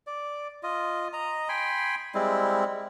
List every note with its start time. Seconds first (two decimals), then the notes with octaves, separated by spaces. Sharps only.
0.07 D5
0.63 F4 D#5
1.13 D#5 A#5
1.49 G5 G#5 B5 C6
2.15 G3 G#3 C4 E4